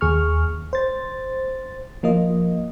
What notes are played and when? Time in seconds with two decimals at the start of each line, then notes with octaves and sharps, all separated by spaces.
0.01 D#2 G#4 C#6 F6
0.73 C5 A6
2.03 F3 A#3 F4 D#5